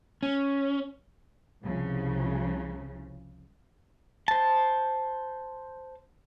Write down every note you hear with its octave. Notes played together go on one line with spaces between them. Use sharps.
C#4
C2 C#3 F3
C5 A5